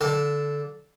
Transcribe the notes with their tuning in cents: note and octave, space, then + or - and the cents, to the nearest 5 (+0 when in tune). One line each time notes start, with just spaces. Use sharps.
D3 -15 F5 +35 A5 +0